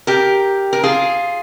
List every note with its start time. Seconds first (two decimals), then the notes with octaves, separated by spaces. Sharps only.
0.07 G4 A#4
0.73 A#4
0.84 F4 G#4